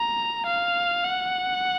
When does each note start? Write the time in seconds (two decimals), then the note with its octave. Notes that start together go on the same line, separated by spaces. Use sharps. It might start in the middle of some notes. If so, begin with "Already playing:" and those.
Already playing: A#5
0.46 F5
1.05 F#5